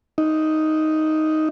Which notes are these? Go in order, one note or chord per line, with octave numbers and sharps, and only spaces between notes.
D#4